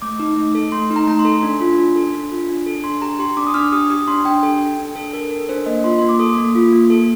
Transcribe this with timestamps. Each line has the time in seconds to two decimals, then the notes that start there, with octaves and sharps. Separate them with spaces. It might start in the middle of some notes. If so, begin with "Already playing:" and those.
0.02 A3 D6
0.19 D#4
0.37 A3
0.55 A4
0.72 A3 C6
0.90 D#4
0.96 A#5
1.07 A3 A#5
1.19 C6
1.25 A4
1.43 D4
1.61 F4
1.78 D4
1.96 A4
2.14 D4
2.31 F4
2.49 D4
2.66 A4
2.84 D4 C6
3.02 G4 A#5
3.19 G4 C6
3.37 D4 D6
3.47 D#6
3.54 D4 F6
3.72 G4 D#6
3.90 G4 D#6
4.08 D4 C6
4.25 D4 G5
4.43 A4 G5
4.60 A4
4.79 D4
4.96 D4 A4
5.13 A4 A#4
5.31 A4 A#4
5.49 D4 C5
5.66 A#3 D#5
5.84 F4 C6
5.99 A#3 C6
6.09 D6
6.19 A4 D#6
6.37 A#3
6.55 F4
6.73 A#3
6.90 A4